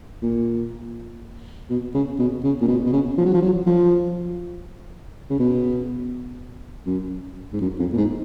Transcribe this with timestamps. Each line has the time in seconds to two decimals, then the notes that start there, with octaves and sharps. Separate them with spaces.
0.22 A#2
1.70 B2
1.95 C#3
2.19 B2
2.44 C#3
2.61 A#2
2.68 B2
2.86 B2
2.93 C#3
3.18 F3
3.26 F#3
3.34 F3
3.42 F#3
3.66 F3
5.30 C#3
5.39 B2
6.86 F#2
7.53 G#2
7.61 F#2
7.79 F2
7.93 A#2
7.97 G#2